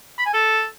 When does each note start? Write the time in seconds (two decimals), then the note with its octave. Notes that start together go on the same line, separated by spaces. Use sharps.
0.19 B5
0.26 G#5
0.34 A4